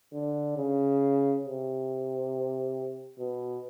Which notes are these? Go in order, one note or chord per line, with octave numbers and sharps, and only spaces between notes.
D3
C#3
C3
B2